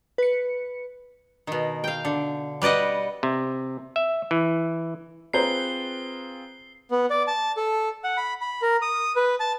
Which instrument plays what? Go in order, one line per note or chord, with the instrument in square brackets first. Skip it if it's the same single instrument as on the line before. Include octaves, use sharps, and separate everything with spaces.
[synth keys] B4 C#7
[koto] B2 D#3
F5 G5
D3
G3 B4 D5 D#5 F#5
[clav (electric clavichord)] C3
E5
E3
[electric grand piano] C4 F4 G#4 [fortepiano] B4 C5 A#5 [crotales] C7 G7
[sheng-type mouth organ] B3
D5
A5
A4
F#5
B5
B5
A#4
D#6
B4
A5